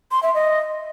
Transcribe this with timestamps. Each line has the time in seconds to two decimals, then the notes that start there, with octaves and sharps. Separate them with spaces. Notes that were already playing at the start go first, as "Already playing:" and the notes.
0.11 C6
0.23 E5
0.34 D#5